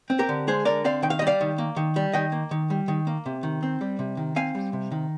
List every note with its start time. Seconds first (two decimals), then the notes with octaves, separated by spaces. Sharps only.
0.10 C4
0.19 G4 A#4
0.29 D3
0.47 G#3 G#4 C5
0.65 D3 A#4 D5
0.84 C4 D5 F5
1.03 D#3 G5
1.10 F5
1.19 D#5
1.22 G3
1.27 D5 F5
1.41 D#3
1.58 A#3
1.76 D#3
1.96 G3
2.13 D#3 D#5 G5
2.32 A#3
2.51 D#3
2.70 G3
2.88 D#3
3.07 A#3
3.26 C3
3.43 D#3
3.63 C4
3.81 G3
3.99 C3
4.17 D#3
4.36 C4 F5 G#5
4.55 G3
4.73 C3
4.92 D#3